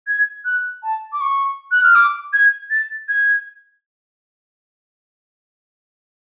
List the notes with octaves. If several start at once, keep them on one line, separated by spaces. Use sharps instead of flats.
G#6
F#6
A5
D6
C#6
F#6
F6
D6
G#6
A6
G#6